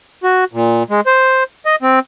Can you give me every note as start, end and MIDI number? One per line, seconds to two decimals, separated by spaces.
0.24 0.44 66
0.53 0.83 46
0.90 1.01 56
1.06 1.44 72
1.66 1.76 75
1.82 1.99 60